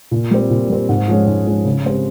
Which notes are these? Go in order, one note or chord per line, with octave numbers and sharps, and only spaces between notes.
A#2
G3 C4
A#2
G3 C4
G#2
F3 G#3 C#4 G#4
G#2
F3 G#3 C#4 G#4
C#3
G#3 C4 G4 C5